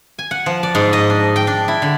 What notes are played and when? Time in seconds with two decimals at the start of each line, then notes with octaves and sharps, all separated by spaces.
0.19 G#5
0.31 F#5
0.46 F3
0.63 D5
0.75 G#2
0.93 D#5
1.10 D4
1.36 G5
1.47 D4
1.68 E4
1.82 D3